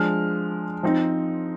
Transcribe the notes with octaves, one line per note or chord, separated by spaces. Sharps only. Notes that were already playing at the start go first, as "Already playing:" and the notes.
Already playing: F3 G#3 D4 F6
F3 C4 D#4